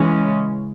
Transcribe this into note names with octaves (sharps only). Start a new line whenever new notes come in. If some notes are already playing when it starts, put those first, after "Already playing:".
Already playing: C#3 E3 G#3 C#4